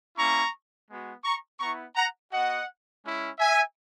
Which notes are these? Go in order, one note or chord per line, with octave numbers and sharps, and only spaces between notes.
A#3 C#4 E4 A#5 C#6
G#3 B3 F#4
A#5 C#6
B3 E4 A#5 C#6
F#5 A#5
B3 F#4 D#5 F#5
G#3 C#4 E4
E5 G#5